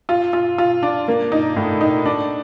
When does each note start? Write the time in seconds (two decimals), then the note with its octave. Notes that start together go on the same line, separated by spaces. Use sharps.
0.09 F4
0.33 F4
0.58 F4
0.83 D4
1.08 A#3
1.32 D#4
1.56 A2
1.81 D#4
2.06 D4